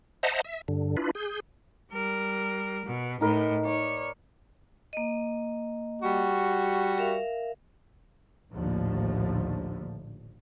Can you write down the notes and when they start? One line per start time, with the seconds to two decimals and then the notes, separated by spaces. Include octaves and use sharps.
0.23 C5 D#5 E5 F#5 A5 A#5
0.45 E5
0.68 G2 D3
0.97 D4 E4 F4 B4
1.15 G#4 G6
1.92 G3 A#4
2.86 B2
3.21 A2 D#4 A#4 B4
3.65 C#5 D5 D6
4.93 A#3 D#5
6.03 G3 F#4
6.98 A#4 E5 F5
8.53 A#1 D#2 A2 D3 F3 A3